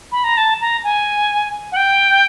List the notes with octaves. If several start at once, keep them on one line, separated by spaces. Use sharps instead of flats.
B5
A#5
A5
A#5
G#5
F#5
G5